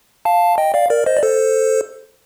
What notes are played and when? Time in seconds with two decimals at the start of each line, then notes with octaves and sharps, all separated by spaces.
0.25 F5 A5
0.58 D#5 G5
0.74 D5 F5
0.90 A#4 D5
1.06 C5 D#5
1.17 D5
1.23 A4 C5